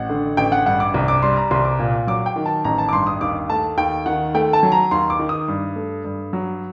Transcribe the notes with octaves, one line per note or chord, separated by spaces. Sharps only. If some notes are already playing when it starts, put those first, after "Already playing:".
Already playing: A1 F#5
D3
A1 G5
F#5
G2 F#5
D6
C2
D6
G3 C6
A#5
C2 C6
D6
A#2
F#3 D6
G5
D#3
A5
A1 A#5
A5
D6
G2 C6
D#6
D#2 D6
A3 A5
D#2 G5
D#3 F#5
A3 G5
A5
F#3
A#5
D#2 C6
D6
D#3
D#6
G2
A3
G2
F#3